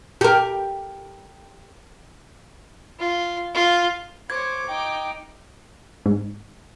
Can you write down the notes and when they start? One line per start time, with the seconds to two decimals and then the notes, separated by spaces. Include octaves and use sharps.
0.21 G4 A#4
3.00 F4
3.55 F4
4.30 C5 C#5 D6 G#6
4.68 D#4 G5
6.06 G#2